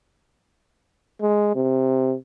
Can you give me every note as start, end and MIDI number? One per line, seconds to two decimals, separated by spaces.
1.21 1.52 56
1.55 2.15 48